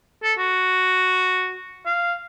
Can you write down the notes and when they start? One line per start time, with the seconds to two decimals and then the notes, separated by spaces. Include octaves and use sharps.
0.23 A4
0.38 F#4
1.86 F5